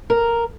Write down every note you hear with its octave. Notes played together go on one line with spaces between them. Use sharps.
A#4